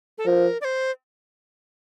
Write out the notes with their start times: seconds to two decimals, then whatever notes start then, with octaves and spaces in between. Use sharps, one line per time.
0.18 A4
0.26 F3 A#4
0.61 D5
0.64 C5